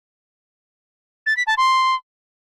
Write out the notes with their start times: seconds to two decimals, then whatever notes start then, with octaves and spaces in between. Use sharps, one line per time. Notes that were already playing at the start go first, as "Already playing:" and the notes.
1.26 A6
1.37 B6
1.47 A5
1.57 C6